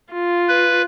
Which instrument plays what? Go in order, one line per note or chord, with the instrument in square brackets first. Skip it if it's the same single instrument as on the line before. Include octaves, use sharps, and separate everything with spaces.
[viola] F4
[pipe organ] B4